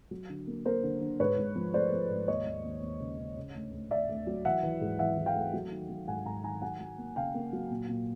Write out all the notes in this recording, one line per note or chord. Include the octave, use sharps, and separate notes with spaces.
F#3
D3
A#3
A#3 A#4 C5
D3
D3
G#2 B4 C#5
G#2
F3
A3 C5 D5
F3
G#2
D#2 C#5 D#5
D#2
D#2
D#2
C#3
C#3
C#3
D2
D2
D2 D5 E5
D2
F#3
E3 E5 F#5
E3
G#2
E3 E5 F#5
E3
F5 G5
A3
F#3
D#3
F#3
G#2 F#5 G#5
G#2 G#5 A#5
D#3 G#5 A#5
F#3 F#5 G#5
F#3
A#3
C#3 F5 G5
A#3
F#3
A#2
A#2